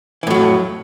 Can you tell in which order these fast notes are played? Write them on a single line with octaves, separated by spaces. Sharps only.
E3 A2 F#3 F2